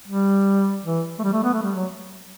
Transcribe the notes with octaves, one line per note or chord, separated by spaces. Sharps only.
G3
E3
A3
G3
A3
B3
A3
G3
F#3